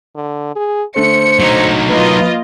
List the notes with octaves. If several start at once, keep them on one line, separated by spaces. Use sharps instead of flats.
D3
G#4
D3 A3 C5 C#7
F#3 D#4
A#3 F4 B4 D#5